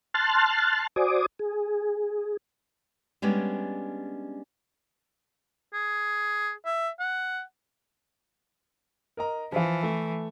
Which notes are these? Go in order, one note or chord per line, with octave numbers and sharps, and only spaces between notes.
A5 C6 F6 F#6 A6
F#4 C5 D5 G#5 D6 D#6
G#4
G3 G#3 B3 C#4 D4
G#4
E5
F#5
A#4 D#5 A#5
E3 F3 F4
A3